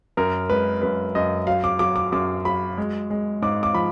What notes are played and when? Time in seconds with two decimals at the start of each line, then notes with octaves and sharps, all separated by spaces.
0.17 F#2 A#4
0.50 G#3 B4
0.82 F#2 B4
1.15 F#2 D#5
1.47 F#3 F5
1.64 D6
1.79 F#3 D6
1.96 D6
2.12 F#2 D6
2.45 F#3 B5
2.78 G#3
3.10 G#3
3.42 G#2 D6
3.63 D6
3.75 F3 B5